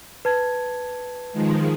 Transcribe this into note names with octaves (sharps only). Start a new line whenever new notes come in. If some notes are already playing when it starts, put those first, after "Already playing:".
B4 A5 G#6
D#3 F3 G#3